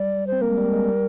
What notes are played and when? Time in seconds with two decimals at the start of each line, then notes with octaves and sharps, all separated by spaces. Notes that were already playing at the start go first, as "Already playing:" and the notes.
Already playing: G3 D5
0.27 C5
0.32 C4
0.41 A#3 A#4
0.49 G#3
0.57 G3
0.72 G#3
0.84 G3